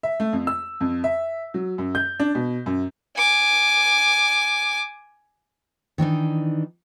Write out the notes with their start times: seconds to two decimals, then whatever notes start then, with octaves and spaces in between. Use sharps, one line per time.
0.03 E5
0.20 A3
0.33 F2
0.47 E6
0.81 F2
1.04 E5
1.54 F#3
1.78 F#2
1.95 G6
2.20 D4
2.35 B2
2.66 F#2
3.17 G#5 D6
5.98 D#3 E3 D4 D#4